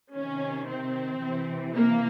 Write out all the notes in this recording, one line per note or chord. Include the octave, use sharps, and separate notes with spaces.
C3 D#3 C#4
C4
C3 E3
A#3